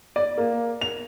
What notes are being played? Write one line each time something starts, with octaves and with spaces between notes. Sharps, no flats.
D5
A#3
F7